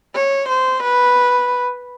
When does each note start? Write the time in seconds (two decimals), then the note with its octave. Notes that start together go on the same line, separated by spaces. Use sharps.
0.15 C#5
0.49 C5
0.83 B4